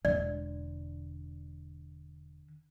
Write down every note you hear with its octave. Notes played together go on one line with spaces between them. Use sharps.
E1 D3 D5